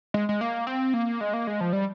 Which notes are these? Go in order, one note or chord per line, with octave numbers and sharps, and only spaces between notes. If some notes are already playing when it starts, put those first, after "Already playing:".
G#3
G#3
A#3
C4
A#3
G#3
A#3
G#3
F3
G3